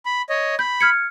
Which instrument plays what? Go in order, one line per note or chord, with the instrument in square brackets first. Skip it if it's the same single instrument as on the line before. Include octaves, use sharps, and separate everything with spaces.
[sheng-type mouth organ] B5
C#5 D#5
[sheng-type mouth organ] B5 [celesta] G6
[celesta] F6 G#6 C#7